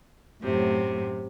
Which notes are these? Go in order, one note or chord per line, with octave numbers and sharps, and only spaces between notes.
F#2 A2 C3